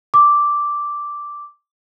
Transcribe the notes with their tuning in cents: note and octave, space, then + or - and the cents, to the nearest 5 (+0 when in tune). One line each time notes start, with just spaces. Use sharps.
D6 -5